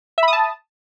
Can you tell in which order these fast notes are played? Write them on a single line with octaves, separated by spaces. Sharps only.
E5 B5 D#6 A5